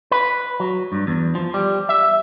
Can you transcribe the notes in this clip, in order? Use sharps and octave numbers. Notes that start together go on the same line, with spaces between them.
B4
F#3
G2
E2
F3
G3
E5